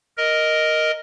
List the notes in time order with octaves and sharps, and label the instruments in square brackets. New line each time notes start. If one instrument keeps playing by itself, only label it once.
[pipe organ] A#4 D#5